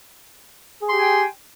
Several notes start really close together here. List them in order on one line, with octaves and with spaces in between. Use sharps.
G#4 C6 G4 G#5 G5